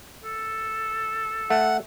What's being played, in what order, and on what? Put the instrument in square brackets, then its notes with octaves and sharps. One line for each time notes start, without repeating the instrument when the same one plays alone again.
[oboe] A4
[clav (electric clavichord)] A3 [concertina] F#5